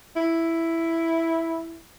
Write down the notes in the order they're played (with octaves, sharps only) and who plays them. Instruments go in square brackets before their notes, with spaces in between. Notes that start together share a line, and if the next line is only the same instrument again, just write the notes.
[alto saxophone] E4